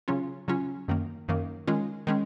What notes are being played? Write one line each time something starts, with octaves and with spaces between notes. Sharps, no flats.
C#3 F#3 C#4 F4
C#3 F#3 C#4 F4
F#2 D#3 A#3
F#2 D#3 A#3
D#3 G#3 C#4 F4
D#3 G#3 C#4